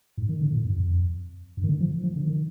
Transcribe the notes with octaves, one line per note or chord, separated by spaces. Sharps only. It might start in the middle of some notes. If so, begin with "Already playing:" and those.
G#2
D#3
D3
A#2
G2
F2
G2
D#3
D3
F3
F3
D3
D#3